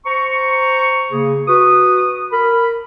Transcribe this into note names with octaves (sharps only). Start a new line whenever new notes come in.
C5 A#5 C#6
C#3 A#3 G#4
F#4 B4 C#6 D#6
A#4 B5